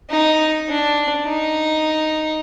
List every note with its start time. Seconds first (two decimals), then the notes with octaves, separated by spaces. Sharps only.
0.10 D#4
0.69 D4
1.26 D#4